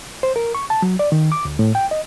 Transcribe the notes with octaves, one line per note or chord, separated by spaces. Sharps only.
C5
A#4
C#6
A5
F#3
D5
D#3
D6
D2
A2
G5
D#5